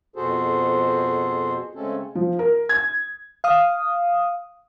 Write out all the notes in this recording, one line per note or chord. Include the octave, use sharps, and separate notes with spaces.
F2 B2 F#4 G#4 A4 C5
C#3 G#3 A3 C4 C#4 A4
F3
A#4
G#6
F5 D#6